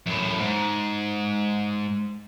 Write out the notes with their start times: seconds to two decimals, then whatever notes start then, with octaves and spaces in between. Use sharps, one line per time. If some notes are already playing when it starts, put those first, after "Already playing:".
0.06 F#2 A2
0.40 G#2